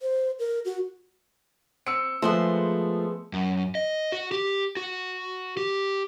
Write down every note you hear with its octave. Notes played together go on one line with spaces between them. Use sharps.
C5
A#4
F#4
C4 E6 C#7
F3 G#3 A3 B3 C5
F#2
D#5
F#4
G4
F#4
G4